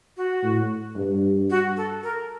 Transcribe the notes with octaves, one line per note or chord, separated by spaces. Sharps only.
F#4
A2
G2
F#4
A4
A#4